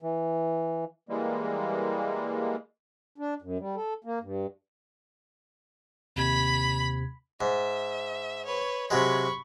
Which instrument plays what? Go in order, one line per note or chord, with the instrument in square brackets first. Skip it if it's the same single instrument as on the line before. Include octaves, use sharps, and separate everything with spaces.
[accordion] E3
E3 G3 G#3 A#3
[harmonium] D4
F#2
G3
A4
A#3
G2
[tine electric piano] D#2 C3 G#6 [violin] B5
[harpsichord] G#2 [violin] E5
[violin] B4 C#5
[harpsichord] C3 F#3 G#3 [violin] B5 C#6